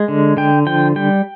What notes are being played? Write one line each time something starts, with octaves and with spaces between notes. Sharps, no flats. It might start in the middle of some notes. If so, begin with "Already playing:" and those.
Already playing: G#3
D3
D3 G5
F3 G5
G3 G5